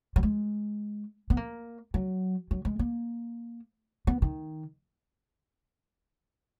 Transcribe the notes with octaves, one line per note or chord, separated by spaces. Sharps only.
F#3
G#3
B3
A#3
F#3
F#3
G#3
A#3
B3
D#3